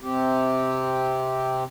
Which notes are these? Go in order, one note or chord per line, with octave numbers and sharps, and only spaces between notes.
C3 C4 G4